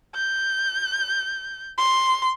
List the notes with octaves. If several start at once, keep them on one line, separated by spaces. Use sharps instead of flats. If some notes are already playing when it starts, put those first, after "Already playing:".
G6
C6